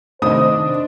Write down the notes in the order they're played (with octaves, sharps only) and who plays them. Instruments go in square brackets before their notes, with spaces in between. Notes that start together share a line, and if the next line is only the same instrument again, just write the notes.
[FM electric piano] C3 D#3 A3 [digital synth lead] D4 [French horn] C5 [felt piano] D#5 D#6